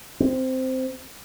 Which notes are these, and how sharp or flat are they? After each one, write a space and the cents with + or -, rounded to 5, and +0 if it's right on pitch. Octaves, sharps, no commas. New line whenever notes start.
C4 -10